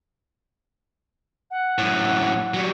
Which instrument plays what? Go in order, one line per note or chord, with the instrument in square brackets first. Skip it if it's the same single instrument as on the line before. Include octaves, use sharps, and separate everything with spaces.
[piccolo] F#5
[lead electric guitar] F#2 A2
F#3 G3